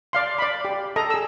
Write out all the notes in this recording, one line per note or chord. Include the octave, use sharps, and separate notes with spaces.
D5 F5 C6
D5 B5
G4
A4 D#5 A#5
G#4 E6